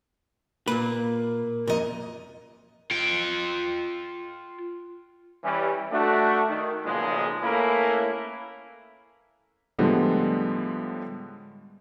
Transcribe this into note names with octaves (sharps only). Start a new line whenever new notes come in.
A#2 A#3 B4
F2 A#2 A#4 D#5
F4 G5
E3 G3 C#4
A3 D4 F#4
D#3
B1 A#2 C#3 F3 G#3
A3 A#3 C#4 E4 A#4 B4
A2 D3 F3 G3 G#3 B3